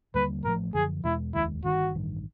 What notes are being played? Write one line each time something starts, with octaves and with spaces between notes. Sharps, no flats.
D#2 D3 G3 A#3 B4
A1 A2 F3 A3 A#4
F#2 D3 F3 G#4
E2 B2 G#3 E4
F1 D#2 D#3 G#3 E4
G1 G2 D#3 F#4
A1 G2 D#3